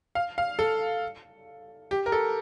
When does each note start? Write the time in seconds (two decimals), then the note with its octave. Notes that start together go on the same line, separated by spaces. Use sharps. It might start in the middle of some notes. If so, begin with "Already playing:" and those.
0.15 F5
0.38 F5
0.59 A4
1.91 G4
2.06 A#4
2.12 A4